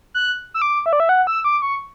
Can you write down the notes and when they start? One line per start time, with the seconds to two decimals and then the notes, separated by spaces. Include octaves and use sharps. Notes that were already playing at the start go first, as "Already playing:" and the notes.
0.14 F#6
0.54 E6
0.62 D6
0.86 E5
0.93 D5
1.00 E5
1.09 F#5
1.27 E6
1.44 D6
1.62 C#6